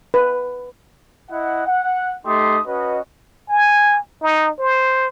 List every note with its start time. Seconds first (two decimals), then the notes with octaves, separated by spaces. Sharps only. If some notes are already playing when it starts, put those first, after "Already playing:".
0.14 B4
1.29 E4 D#5 F#5
1.66 F#5
2.25 A3 D#4 G4 C6 D#6
2.65 C#4 F#4 B4 D#5
3.49 G#5
4.22 D#4
4.59 C5